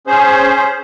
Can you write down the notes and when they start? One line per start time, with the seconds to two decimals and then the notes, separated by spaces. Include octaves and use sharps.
0.07 C#4 G#4 C5